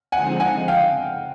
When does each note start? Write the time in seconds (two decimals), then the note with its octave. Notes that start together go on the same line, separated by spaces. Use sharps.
0.12 D3 F3 G#3 C4 D#4 F#5 G#5
0.40 F#5 G#5
0.68 F5 G5